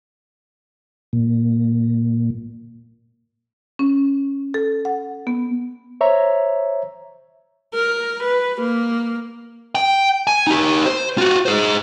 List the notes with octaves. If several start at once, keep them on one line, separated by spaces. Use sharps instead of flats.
A#2
C#4
A4
F#5
B3
C5 C#5 E5 A#5
A#4
B4
A#3
G5
G#5
D#4 G4
C5
F4 F#4
G#4 C5